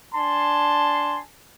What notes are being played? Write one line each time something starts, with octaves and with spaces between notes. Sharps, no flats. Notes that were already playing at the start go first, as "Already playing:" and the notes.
D4 G#5 A5 C6